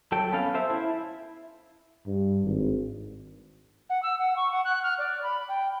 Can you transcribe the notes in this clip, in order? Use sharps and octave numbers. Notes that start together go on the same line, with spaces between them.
F#3 A4 G5
B3 C#4 A4 F5
A4 C5 E5
E4
G2
G#1
F#5
E6
F#5
C#6
F#5
F#6
F6
D5
B5
G5